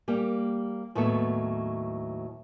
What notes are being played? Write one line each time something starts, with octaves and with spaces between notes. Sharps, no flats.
G3 A#3 G4
D#2 A2 F#3 B3 A4